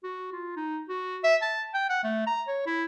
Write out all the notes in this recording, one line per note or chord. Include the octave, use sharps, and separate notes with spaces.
F#4
F4
D#4
F#4
E5
A5
G5
F#5
A3
A#5
C#5
E4